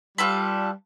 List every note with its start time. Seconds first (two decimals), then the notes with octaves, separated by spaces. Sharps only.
0.18 G3 F4 A4 B4